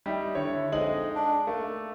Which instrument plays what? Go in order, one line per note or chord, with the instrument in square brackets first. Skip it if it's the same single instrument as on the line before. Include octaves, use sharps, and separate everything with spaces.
[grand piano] G3 D#4 E4
[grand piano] D3 C#5 [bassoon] E4
[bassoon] F2 [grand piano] G#3 D#4 F#7
[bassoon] D4
[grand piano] A3 [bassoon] A#3